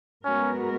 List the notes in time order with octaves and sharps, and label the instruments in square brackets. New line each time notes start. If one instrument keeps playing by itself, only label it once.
[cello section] G#3 B3 F#4 A#4 [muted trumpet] C#4